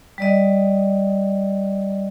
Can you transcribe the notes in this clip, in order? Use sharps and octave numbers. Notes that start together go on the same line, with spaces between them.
G3 D5 D#5